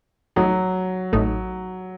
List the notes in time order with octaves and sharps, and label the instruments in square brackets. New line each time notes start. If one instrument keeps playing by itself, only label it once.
[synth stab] A1 A2 A3 D#4 [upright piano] F#3
[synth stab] A1 A2 A3 D#4